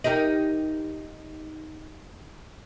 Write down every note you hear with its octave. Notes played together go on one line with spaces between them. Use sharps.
D#4 G4 A#4